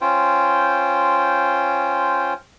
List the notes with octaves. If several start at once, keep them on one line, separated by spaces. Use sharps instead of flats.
C#4 F4 C5 G5